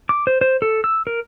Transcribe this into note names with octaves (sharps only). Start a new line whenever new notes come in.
D6
C5
C5
A4
E6
A#4